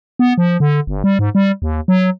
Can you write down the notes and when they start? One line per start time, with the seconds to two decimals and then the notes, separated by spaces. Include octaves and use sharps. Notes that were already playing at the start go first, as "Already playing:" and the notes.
0.19 B3
0.38 F3
0.60 D3
0.87 G1
1.04 G3
1.19 G#2
1.35 G3
1.62 D#2
1.88 F#3